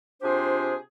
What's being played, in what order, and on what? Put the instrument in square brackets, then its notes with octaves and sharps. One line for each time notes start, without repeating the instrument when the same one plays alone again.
[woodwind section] C3 D4 F4 G4 G#4 C5